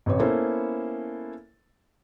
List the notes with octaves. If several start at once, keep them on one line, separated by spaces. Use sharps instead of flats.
A1 C3 C#5
A#3 B3 C#4 E4 A4 C5